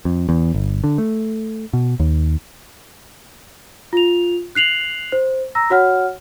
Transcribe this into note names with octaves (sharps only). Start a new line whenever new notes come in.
F2
E2
G1
D3
A3
B2
D#2
F4 F7
F#6 C7 F7 F#7
C5
A#5 E6 A#6
F#4 C#5 F#5 F6